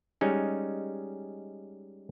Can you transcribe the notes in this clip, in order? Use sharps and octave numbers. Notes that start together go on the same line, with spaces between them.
G3 G#3 C#4 D#4